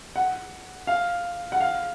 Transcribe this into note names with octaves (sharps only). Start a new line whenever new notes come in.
F#5
F5
F#5
F5